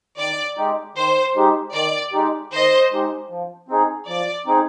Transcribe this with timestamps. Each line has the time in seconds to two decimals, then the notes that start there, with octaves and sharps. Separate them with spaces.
0.18 D#3 D5
0.57 G#3 D#4 G4
0.96 D#3 C5
1.35 G#3 D#4 G4
1.74 D#3 D5
2.13 G#3 D#4 G4
2.52 D#3 C5 D#5
2.91 G#3 D#4 G4
3.29 F3
3.69 C4 D#4 G#4
4.08 F3 D5
4.46 C4 D#4 G#4